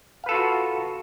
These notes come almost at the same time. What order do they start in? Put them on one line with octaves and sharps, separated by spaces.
F5 B4 A4 F4 F#4